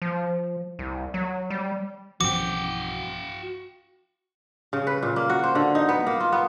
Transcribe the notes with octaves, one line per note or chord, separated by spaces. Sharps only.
F3
C2
F#3
G3
B1 G2 E3 F3 C#4 F#4 G5 D6
C#3
B4
A#2
A#3
F#4
C5
D3
D#4
B3
A#3
F4
B3